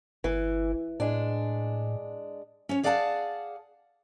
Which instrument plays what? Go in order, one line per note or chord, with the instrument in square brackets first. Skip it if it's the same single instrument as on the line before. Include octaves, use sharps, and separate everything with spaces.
[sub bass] G1 [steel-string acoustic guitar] E3
[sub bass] A2 [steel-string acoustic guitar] G#3 D4
[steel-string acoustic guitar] C#4 C#5
G#4 D5 F5 F#5 G#5 A5